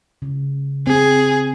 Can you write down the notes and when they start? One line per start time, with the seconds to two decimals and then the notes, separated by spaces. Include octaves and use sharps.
0.22 C#3
0.87 C4 G#4